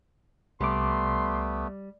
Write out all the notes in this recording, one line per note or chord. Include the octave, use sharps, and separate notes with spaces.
C2 G3 A3 B3 C6 D6